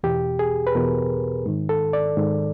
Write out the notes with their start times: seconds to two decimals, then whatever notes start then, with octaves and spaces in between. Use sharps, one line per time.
0.03 E2 B2 G4
0.39 G#4
0.67 B4
0.75 E2 B2 A#4
1.46 G#2 D#3
1.69 A4
1.93 D5
2.17 G#2 D#3